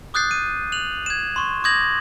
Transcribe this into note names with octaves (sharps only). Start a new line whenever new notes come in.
D6 D#6 F#6 G6 A6 C7
D#7
F#6 F7 F#7
G#6 E7
C6 C#6
D6 D#6 G6 G#6 A#6 F#7